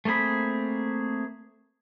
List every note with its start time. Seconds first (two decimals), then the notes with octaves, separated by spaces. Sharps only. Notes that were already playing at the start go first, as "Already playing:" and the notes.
0.05 A3 A#3 C4 G#4 B5